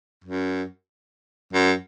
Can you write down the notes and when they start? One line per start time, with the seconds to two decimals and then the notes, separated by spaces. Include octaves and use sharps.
0.24 F#2
1.53 F#2